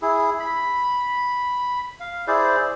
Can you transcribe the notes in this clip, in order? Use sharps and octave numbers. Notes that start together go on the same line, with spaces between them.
E4 G#4
B5
F5
E4 G#4 C5 D5